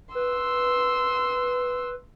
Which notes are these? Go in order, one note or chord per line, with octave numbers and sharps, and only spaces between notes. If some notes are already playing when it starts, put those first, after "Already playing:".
B4 C6 E6